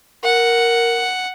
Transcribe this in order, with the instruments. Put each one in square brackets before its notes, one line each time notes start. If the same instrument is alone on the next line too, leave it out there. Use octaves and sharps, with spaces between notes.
[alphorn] A#4 [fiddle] F#5